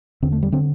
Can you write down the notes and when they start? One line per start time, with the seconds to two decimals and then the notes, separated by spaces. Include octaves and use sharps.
0.22 E2 D3 C4
0.32 A3
0.43 G3
0.52 D3 C4